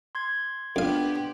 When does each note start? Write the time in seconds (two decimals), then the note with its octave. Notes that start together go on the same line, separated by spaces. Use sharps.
0.15 C6 G#6
0.76 F2 B3 D4 G4 F5